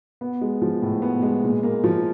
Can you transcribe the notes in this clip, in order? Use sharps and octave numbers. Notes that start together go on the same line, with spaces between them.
B3
G#3
F3
A2
B3
G#3
A#2
A#3
F3